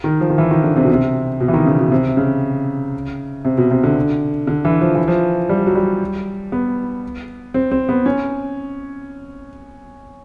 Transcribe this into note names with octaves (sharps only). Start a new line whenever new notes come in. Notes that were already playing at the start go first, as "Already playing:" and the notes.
D#3
F3
D#3
E3
D#3
D3
C3
B2
C3
B2
E3
D#3
C#3
B2
C3
C#3
C3
B2
C3
D3
D3
E3
F3
E3
F3
G3
F#3
G3
B3
C4
C4
B3
C#4